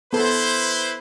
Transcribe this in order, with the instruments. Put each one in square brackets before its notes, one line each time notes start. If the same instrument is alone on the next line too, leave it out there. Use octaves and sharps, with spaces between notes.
[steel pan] B3 A4 [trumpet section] E4 B4 C5